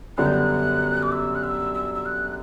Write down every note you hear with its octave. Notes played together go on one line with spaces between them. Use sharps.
F#2 D3 G3 B3 F#6
G6
F#6
D6
E6
F#6
E6
E6
E6
F#6